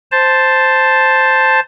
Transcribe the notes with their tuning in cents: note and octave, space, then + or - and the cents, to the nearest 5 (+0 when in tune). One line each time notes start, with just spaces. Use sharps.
C5 +0 A5 +0